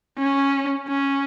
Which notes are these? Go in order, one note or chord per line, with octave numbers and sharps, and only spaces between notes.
C#4
C#4